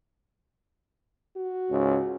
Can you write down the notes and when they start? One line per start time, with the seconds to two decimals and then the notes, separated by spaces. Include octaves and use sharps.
1.36 F#4
1.71 C#2 G#2 C#4